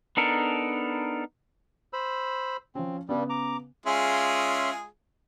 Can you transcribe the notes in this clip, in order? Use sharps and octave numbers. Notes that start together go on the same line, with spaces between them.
B3 D4 D#4 A4 A#4
C5 B5 E6
F3 C4 C#4
G2 C#3 G3 B3
A#5 D6
G#3 C#4 F4 G#4 E5 C6